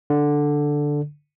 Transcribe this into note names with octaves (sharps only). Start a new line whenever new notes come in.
D3